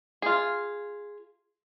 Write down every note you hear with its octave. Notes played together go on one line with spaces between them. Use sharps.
F4 G#4